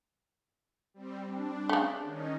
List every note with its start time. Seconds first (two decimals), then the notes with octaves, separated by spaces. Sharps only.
0.94 G3 C4
1.26 D4
1.69 C#3 A3
2.04 D#3 C#4 D#4